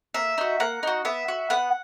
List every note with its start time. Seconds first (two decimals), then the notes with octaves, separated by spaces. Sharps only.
0.14 A#3 E5
0.38 D#4 F#4
0.60 A#3 F#5
0.83 D#4 F#4
1.05 B3 E5
1.28 F#4
1.50 B3 F#5